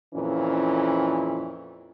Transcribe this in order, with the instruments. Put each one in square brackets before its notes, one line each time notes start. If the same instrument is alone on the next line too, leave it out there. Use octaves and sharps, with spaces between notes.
[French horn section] F2 A#2 E3 C#4